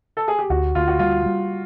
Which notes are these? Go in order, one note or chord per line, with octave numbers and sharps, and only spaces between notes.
A4
G#4
G4
D2 F#4
D2 F4
F#4
G3 F4
G3